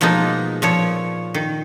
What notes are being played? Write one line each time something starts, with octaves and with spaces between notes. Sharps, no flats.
B2 F3 G#3 A#3 D#4
A#2 F3 C#5
D#3